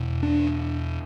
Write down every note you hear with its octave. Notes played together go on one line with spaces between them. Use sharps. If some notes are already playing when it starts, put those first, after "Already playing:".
Already playing: E2 B2
D4